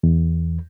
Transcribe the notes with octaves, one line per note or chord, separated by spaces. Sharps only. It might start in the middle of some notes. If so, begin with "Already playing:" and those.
E2